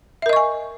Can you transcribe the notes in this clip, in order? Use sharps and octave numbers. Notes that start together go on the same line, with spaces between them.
A#4 D#5 E5 G#5 C#6